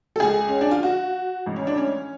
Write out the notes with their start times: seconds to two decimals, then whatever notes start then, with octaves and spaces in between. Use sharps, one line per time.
0.16 A4
0.20 C#2 C#3 G#4
0.49 C#4
0.61 D4
0.71 F4
0.83 F#4
1.46 A1 G#2
1.56 C#4
1.67 D4
1.77 C#4